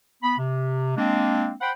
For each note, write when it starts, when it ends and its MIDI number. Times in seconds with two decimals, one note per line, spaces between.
0.23 0.36 59
0.23 0.36 83
0.38 0.97 48
0.97 1.53 56
0.97 1.53 58
0.97 1.53 60
0.97 1.53 62
1.61 1.71 72
1.61 1.71 78
1.61 1.71 79
1.61 1.71 83